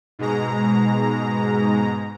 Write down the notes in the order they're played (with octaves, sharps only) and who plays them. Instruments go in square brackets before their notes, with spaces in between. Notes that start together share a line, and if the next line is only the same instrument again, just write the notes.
[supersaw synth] G#2 B2 G#3 A#5